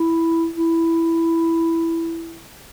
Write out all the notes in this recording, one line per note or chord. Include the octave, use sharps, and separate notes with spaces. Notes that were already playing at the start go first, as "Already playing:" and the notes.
Already playing: E4
E4